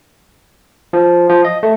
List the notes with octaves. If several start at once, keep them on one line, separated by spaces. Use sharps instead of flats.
F3
F3
D#5
A3